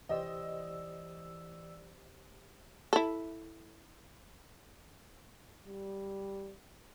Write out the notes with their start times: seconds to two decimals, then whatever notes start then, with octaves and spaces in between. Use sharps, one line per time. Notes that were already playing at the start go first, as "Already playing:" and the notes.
0.09 C2 E3 G4 C5 D5 D#5 E6
2.93 E4 A4
5.67 G3